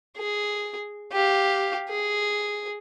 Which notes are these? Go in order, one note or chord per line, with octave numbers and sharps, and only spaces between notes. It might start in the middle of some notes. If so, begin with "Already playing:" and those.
G#4
G4 F5
G#4